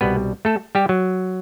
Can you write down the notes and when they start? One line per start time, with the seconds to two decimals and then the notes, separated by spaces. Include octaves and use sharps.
0.01 C2 B2 G3 B3 B4
0.45 A3 A4
0.75 G3 G4
0.89 F#3